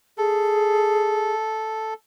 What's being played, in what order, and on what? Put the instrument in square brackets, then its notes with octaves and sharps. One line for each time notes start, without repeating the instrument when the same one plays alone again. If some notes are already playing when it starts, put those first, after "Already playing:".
[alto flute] G#4 [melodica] A4